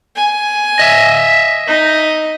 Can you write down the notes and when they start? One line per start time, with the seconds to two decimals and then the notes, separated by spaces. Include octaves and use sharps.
0.16 G#5
0.79 D#5 E5
1.68 D#4